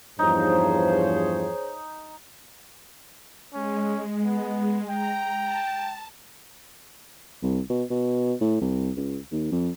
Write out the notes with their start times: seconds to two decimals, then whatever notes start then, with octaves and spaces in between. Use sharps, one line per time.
0.19 E2 G2 F3 D#4 G#4 C5 C#5
3.54 G#3 C#4
4.25 B3
4.89 G5 A#5
5.43 A5
7.43 C2
7.70 B2
7.90 B2
8.41 A2
8.61 C2
8.97 C#2
9.32 D#2
9.52 F2